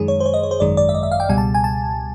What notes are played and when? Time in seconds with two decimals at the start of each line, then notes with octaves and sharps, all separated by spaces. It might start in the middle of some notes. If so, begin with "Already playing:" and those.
Already playing: F#2 D#3 G#3 G#4
0.08 C#5
0.20 C5
0.26 C#5
0.34 D#5
0.43 C#5
0.51 C5
0.60 G#1 F#2 D#3 G#3 D5
0.77 D5
0.89 E5
0.94 D#5
1.03 E5
1.11 F5
1.20 G5
1.29 C#2 B2 G3 G#5
1.38 A5
1.54 G#5
1.64 A5